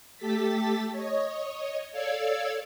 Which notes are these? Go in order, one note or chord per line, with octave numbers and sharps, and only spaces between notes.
A3 G4 A4 A5 A6 B6
C#5 D#5
A4 C#5 D5 F5 E6 G#6